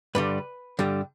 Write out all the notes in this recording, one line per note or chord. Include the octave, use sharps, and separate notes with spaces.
G2 D3 G3 B4
G2 D3 G3